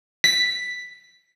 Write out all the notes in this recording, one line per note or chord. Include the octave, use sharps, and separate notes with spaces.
B6